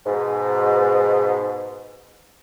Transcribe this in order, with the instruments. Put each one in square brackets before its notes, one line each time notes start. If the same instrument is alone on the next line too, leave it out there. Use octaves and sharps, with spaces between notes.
[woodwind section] G#2 B2